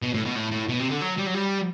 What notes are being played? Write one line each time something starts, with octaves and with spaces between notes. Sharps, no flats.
B2
A2
B2
A2
A2
B2
C3
D3
F#3
G3
F#3
G3